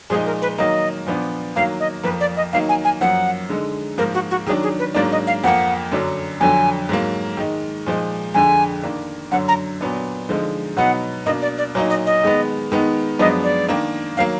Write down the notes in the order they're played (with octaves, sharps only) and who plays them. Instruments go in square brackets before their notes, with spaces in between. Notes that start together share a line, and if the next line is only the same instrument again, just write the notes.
[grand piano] A#2 F3 G#3 D#4 [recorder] G#4
[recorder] A#4
B4
[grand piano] D#3 F#3 A#3 [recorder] D#5
[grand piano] A#2 F3 B3 D4
[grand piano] D#3 F#3 A#3 [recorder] F5
[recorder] D#5
[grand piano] F2 F3 A#3 [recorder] B4
[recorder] D5
D#5
[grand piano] D#3 F#3 A#3 D#4 [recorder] F5
[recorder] G#5
G#5
[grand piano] F#2 F3 A#3 [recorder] F#5
[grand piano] D3 G#3 D#4
[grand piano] G#2 F3 A#3 [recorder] A#4
[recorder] F#4
F#4
[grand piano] D#3 [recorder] G#4
[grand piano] F#3 D4
[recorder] G#4
B4
[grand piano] G#2 F#3 A#3 D4 [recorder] D5
[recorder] D#5
F5
[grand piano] F2 F3 A#3 [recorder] F#5
[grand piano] F#2 D3 F#3 D4
[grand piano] F2 D3 F#3 [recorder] G#5
[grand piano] G#2 F#3 A#3
D#3 G#3 D#4
A#2 F3 G#3 D#4
[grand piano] F2 D3 G#3 [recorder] G#5
[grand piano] D#3 A#3 D4
[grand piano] F#2 D3 F#3 [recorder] F#5
[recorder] A#5
[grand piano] A#2 F#3 B3 D4
D3 F3 G#3 D#4
[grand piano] B2 F#3 B3 D#4 [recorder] F#5
[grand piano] B2 A#3 D4 [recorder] D#5
[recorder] D5
D5
[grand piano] A#2 F#3 A#3 D#4
[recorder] D#5
D#5
[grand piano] D#3 G#3 B3
D#3 G#3 B3 D#4
[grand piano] F#2 F3 G#3 B3 D4 [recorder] D#5
[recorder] D5
[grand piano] D#3 A#3 D4
[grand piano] D#3 F#3 A#3 [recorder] F5